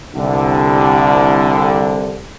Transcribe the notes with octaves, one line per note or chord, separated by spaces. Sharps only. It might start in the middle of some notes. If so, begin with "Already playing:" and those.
C2 D3